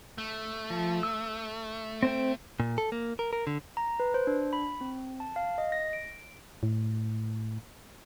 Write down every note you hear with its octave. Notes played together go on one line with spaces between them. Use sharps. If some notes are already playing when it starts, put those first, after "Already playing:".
A3
F3
E6
C4 C5 G5
A#2
A4
A#3
A#4
A#4
D3
A#5
B4
C5
D4
B5
C4
A5
F5
D#5
A#6
D7
A2